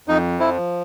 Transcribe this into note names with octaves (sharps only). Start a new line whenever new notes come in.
F2 D#4
F3 E4